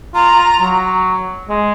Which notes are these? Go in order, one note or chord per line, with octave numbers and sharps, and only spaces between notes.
F4 A#5
F4
F#3
G#3